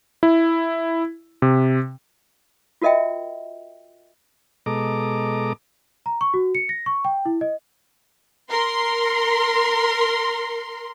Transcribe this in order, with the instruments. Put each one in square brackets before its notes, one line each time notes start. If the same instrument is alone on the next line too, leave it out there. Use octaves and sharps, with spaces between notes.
[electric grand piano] E4
C3
[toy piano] F4 F#4 A#4 D#5 E5 G5
[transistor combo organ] B2 G#3 A4 D#5 A#5 D6
[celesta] A#5
C#6
F#4
C#7
A#6
C#6
G5
E4
D#5
[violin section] A#4 C6